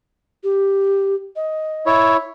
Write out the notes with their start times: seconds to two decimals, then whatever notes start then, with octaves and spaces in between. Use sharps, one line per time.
0.44 G4
1.36 D#5
1.86 E4 C#5